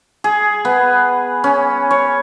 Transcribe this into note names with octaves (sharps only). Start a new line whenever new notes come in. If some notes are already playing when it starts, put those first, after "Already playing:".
G#4
B3
C#4
C#5